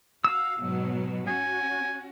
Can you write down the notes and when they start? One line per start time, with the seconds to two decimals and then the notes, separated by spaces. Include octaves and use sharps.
0.24 F#4 F5 E6
0.60 G#2 B2 F#3
1.27 C#4 F#4 G#5